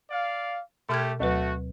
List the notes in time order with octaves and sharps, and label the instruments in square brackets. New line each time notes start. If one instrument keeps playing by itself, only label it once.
[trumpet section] D5 F5
[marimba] B2 F6 G#6 [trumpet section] A3 G4
[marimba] D2 F#3 B4 [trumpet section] A3 F#4